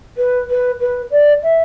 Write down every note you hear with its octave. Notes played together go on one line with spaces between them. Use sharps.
B4
B4
B4
D5
E5